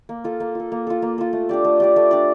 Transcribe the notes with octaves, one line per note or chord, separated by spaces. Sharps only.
A#3
F4 A4
A#3
F4 A4
A#3
F4 A4
A#3
F4 A4
A3
D4 G4 D5
A3
D4 G4 D5
A3
D4 G4 D5